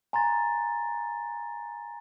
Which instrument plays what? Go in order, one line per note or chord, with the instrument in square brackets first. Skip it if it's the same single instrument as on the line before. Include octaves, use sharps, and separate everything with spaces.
[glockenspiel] G#5 A#5 C6 A6